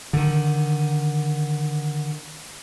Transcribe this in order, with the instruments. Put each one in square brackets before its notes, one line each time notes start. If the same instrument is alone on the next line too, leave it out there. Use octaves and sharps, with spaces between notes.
[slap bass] D3 D#3